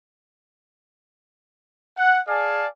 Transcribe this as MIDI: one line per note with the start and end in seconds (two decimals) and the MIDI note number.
1.97 2.20 78
2.28 2.66 68
2.28 2.66 74
2.28 2.66 77
2.28 2.66 80
2.28 2.66 81